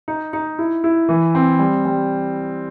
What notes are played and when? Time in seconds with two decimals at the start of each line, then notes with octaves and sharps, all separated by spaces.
0.08 D#4
0.33 D#4
0.59 E4
0.84 E4
1.09 E3
1.35 C4
1.59 G3
1.85 G3